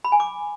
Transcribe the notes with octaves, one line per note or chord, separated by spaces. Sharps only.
B5
G#5
D6